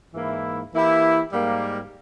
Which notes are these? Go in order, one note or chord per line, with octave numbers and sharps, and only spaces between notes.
G#2 E3 A#3 E4
E3 A#3 E4 G4
G#2 G3 A#3